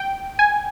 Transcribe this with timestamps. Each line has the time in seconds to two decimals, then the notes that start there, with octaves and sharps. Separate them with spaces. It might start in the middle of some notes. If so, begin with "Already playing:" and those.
Already playing: G5
0.39 G#5